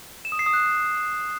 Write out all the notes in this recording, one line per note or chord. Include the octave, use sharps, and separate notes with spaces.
E7
D#6
C7
D#6
F#6